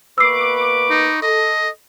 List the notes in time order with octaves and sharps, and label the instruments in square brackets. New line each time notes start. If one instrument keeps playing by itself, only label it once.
[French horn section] B2 A#3 B4 [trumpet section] B5 C#6 D6 [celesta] E6 C7
[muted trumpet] D#4
[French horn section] A4 [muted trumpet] D#5